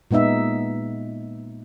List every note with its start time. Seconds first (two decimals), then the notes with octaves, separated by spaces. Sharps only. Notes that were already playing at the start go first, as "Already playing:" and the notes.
0.11 A#2 G#3 B3 D#4 E5